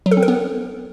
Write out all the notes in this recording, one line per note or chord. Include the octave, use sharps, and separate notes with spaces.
F#3
A4
C4
A#4
B3